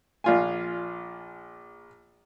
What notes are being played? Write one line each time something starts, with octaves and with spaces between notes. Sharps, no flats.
A#1 F4 G#5